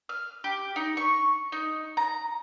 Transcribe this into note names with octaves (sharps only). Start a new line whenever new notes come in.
F6
G4
D#4
C#6
D#4
A#5